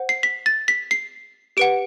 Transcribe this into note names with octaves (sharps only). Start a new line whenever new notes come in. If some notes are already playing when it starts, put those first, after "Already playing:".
Already playing: C5 F#5
C7
B6
A6
B6
C7
G4 B4 F#5 D7